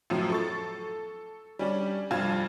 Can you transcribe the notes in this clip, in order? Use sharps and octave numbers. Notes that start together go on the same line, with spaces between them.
F#2 A2 F3
A4 C#6 A6
G3 C#4 D4
F1 G2 F4 G#6 E7